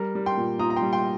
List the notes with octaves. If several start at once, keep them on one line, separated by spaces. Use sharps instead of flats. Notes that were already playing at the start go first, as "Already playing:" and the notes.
Already playing: G3 A#4
G3
G5 C6
A#2
A#2 A#5 D#6
A#5
G5 C6
G3
G5 C6